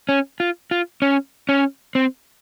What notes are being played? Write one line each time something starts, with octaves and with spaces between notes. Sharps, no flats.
C#4
F4
F4
C#4
C#4
C4